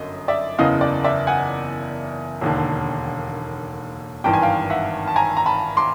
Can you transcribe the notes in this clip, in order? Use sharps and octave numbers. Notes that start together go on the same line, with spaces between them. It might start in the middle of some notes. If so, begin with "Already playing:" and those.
Already playing: G1 F#2 D#5
D5 E5
F#1 E2 C#3 E3 D#5 F5
D5
D5 E5
F#5 G#5
E1 D#2 D3
G#1 G2 E3 G5
G#5
F5 G5
E5 F#5
A5
G#5 A#5
A#5
A5 B5
C6 D6